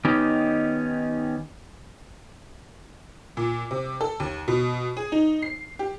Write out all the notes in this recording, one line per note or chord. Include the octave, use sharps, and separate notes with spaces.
D#3 B3 C#4 D#4 G4
A#2
C3
A4
D#2
B2
G#4
D#4
C7
G4